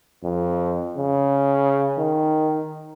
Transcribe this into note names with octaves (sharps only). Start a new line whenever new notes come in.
F2
C#3
D#3